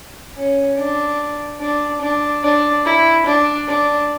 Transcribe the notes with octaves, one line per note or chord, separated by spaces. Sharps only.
C#4
D4
D4
D4
D4
E4
D4
D4